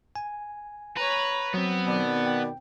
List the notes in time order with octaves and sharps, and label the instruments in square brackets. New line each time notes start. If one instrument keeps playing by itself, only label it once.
[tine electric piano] G#5
[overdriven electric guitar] B4 [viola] C#5 A#5
[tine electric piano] F#3 [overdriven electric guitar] B3 [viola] C4
[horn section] B2 D#3 D5
[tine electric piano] G5